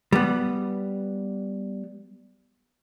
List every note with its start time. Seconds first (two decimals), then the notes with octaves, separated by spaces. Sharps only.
0.13 G3 B3